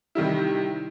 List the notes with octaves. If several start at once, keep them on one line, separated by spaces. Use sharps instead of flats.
C3 D#3 G3 E4